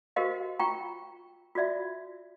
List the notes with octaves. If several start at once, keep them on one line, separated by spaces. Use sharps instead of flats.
F#4 G4 A#4 C5 D#5 F5
F4 G5 A#5 C#6
F4 F#4 D5 E5